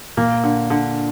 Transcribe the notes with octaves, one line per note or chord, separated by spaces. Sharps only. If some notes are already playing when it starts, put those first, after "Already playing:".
A#2 A#3
D3
D3